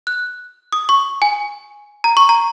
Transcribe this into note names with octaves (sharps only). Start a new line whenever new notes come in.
F#6
D#6
C#6
G#5
A#5
C#6
A#5